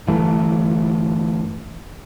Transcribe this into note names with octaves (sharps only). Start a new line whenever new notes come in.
G1 E3 A3